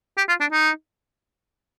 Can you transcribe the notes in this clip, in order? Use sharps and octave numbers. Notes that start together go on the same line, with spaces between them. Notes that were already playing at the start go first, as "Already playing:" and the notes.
G4
F4
D4
D#4